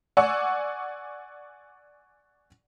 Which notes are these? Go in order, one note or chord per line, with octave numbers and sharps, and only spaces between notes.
D5 F#5 G#5 C#6 E6